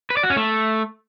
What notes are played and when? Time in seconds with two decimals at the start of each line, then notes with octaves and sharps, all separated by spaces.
0.10 B4
0.17 D5
0.23 F#4
0.30 C#4
0.36 A3